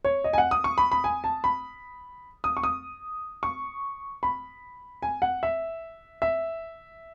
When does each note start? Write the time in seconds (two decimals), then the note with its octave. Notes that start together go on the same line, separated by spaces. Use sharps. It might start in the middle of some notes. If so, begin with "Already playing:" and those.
0.05 C#5
0.24 D#5
0.33 G#5
0.38 F#5
0.51 D#6
0.64 C#6
0.78 B5
0.92 B5
1.04 G#5
1.24 A5
1.44 B5
2.44 D#6
2.57 C#6
2.64 D#6
3.43 C#6
4.23 B5
5.02 G#5
5.22 F#5
5.43 E5
6.22 E5